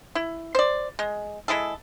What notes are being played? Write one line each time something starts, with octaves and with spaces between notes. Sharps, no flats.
E4
C5 D5
G#3
G#3 E4 G#4 A4